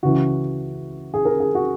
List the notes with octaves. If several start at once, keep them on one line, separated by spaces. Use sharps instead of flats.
C#2 C#3 E3 F#4
G#4
A#4
G#4
F#4